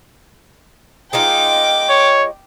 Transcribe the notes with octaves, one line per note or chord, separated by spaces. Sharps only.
G#3 D#4 F4 G5 D6
C#5